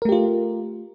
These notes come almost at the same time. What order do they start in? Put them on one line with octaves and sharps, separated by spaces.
A#4 A3 G4 F4